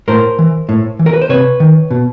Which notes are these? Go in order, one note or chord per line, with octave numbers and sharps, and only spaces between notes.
A2 A#4 C5
E3
A2
E3
A#4
B4
C5
C3 B4 C#5
D#3
B2